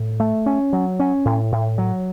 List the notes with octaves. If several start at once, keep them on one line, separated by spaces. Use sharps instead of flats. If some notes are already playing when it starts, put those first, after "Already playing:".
Already playing: A2
A3
C#4
F#3
C#4
A2
A2
F#3